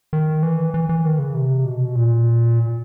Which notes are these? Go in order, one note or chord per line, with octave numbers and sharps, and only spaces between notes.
D#3
E3
E3
E3
D#3
C#3
C3
B2
A#2